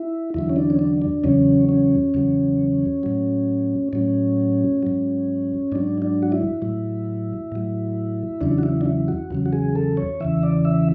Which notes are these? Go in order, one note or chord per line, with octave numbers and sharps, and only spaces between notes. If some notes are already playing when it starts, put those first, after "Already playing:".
Already playing: E4
E2 D3 F#3 E4
C#4
D4
C#4
D4
D4
E2 C#3 F#3 C#4
C#4
E2 C#3 F#3
A2 F#3
A2 F#3 C#4
G#2 F#3
G#2 F#3 D4
D4
F#4
E4
A2 F#3
A2 F#3
E2 C#3 F#3 D4
F#4
E4
D4
E4
F#4
E2 C#3 F#3
F#4
G#4
A4
C#5
E2 C#3 E3 E5
D5
E5